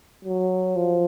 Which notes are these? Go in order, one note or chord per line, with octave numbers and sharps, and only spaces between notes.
F#3
F3